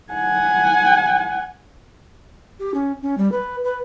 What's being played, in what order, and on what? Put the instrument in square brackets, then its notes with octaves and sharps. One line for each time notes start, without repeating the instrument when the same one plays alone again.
[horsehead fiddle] F#5 G#5
[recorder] G4
C#4
C#4
G3
B4
B4